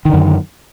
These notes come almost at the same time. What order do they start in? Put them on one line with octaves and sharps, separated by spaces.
D#3 D3 F#2